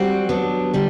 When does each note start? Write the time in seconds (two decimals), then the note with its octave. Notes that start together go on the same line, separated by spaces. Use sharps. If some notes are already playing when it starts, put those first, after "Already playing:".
Already playing: G3 C4 F#4
0.29 F#3 B3 D4
0.73 D3 G3